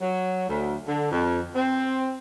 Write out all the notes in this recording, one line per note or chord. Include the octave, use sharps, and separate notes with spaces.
F#3
D2
D3
F2
C4